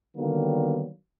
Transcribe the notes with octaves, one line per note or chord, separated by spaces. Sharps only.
D3 D#3 F#3 G3 A#3 B3